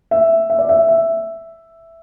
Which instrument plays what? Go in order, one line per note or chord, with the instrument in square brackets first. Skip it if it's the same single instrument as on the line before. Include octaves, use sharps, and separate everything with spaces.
[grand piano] E5
E5
D5
E5
E5